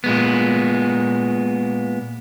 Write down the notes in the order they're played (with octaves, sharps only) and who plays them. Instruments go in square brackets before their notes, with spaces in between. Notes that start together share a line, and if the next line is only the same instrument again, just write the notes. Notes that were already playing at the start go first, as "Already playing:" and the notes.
[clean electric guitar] A#2 G#3 B3